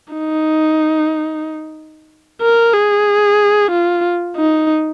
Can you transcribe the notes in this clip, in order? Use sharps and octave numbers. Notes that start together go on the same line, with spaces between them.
D#4
A#4
G#4
F4
D#4